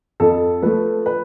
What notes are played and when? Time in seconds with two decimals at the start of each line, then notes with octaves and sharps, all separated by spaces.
0.20 F2 A4
0.62 F3 A3 B4
1.06 B4